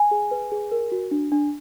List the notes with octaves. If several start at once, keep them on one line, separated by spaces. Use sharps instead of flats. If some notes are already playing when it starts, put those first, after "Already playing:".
Already playing: G#5
G#4
B4
G#4
A#4
F#4
D4
D4